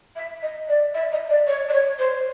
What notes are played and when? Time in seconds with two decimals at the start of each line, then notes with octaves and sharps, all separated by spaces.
0.16 E5
0.42 D#5
0.69 D5
0.95 E5
1.12 D#5
1.30 D5
1.47 C#5
1.69 D5
1.73 C#5
1.99 C5